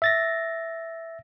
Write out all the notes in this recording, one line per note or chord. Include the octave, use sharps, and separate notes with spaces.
E5 A6 A#6